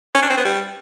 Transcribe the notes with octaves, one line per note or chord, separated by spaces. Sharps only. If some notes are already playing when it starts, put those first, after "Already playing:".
C#4
D4
C4
B3
G3